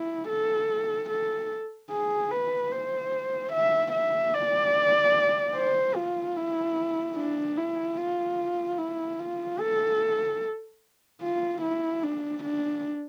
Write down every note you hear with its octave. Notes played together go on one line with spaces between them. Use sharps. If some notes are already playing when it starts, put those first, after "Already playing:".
Already playing: E4
A4
A4
G#4
B4
C5
E5
E5
D5
C5
F4
E4
D4
E4
F4
E4
F4
A4
F4
E4
D4
D4